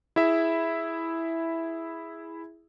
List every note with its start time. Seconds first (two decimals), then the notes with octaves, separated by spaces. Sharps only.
0.16 E4 G#4 E5